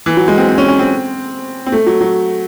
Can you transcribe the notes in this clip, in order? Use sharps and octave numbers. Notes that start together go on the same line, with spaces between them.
E3
F#3
G#3
C4
C4
C#4
C#4
C4
C4
A3
F#3
F#3